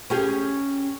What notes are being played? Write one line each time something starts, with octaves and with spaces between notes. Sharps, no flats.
C#4 G4 G#4